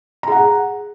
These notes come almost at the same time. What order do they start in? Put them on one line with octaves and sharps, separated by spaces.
A#5 G#4 F#5